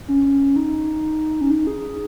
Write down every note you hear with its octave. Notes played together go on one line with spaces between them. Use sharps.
C#4
D#4
C#4
D#4
G#4